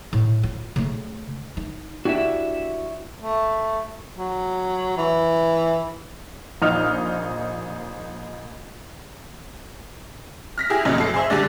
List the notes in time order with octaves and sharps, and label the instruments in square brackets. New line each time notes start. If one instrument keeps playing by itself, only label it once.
[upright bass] A2
F4
C#3 A3
D#4
[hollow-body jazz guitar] D4 E4 G4 [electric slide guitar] F#4 E5
[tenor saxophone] A3
F#3
E3
[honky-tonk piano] A#1 D#4 F6
F6 A#6 B6
E4 G4 G#4
F1 F#2 A#2 C#3 D#4
F#2 B2 A4 C7
G#4 C5 E5
D3 G3 G#3 D4